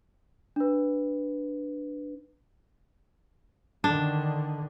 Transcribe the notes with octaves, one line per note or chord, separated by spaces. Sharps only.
D4 B4
D3 D#3 D4